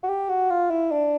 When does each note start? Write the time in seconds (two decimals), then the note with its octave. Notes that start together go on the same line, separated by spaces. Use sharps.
0.03 F#4
0.09 G4
0.29 F#4
0.50 F4
0.71 E4
0.92 D4